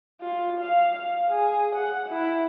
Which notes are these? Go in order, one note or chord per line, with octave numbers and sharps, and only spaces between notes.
F4
F5
F5
G#4
F#5
E4